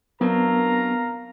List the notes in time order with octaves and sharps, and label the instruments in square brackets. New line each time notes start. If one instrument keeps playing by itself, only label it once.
[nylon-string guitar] F#3 C4 D4 [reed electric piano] B3 [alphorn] A#4 [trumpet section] F5 A#5